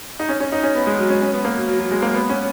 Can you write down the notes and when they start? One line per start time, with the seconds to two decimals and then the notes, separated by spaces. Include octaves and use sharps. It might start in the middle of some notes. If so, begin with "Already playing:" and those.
0.20 D#4
0.29 C#4
0.40 C#4
0.52 D#4
0.63 C#4
0.75 B3
0.87 G#3
0.99 F#3
1.10 C#4
1.22 C#4
1.33 B3
1.45 A#3
1.56 F#3
1.68 F#3
1.79 F#3
1.91 G#3
2.02 A#3
2.14 B3
2.29 C#4